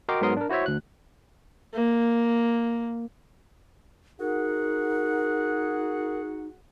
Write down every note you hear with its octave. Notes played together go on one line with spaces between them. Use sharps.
F#4 A#4 D#5 G5 C6 D6
G#2 F#3 B3 A#4 C6 D#6
D4 A#4
E4 F#4 C5 C#5 E5
D2 F#6
A#3
D#4 F#4 G#4 A#4 F#5